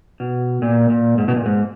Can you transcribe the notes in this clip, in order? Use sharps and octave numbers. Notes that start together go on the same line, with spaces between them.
B2
A#2
A#2
G#2
B2
A#2
G#2